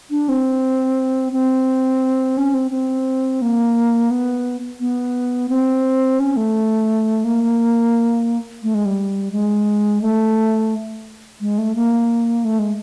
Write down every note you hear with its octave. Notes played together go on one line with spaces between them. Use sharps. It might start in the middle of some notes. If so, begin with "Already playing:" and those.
D4
C4
C4
C#4
C4
C4
A#3
B3
B3
C4
C#4
A3
A#3
A3
G#3
G3
G#3
A3
G#3
A3
A#3
A3
G#3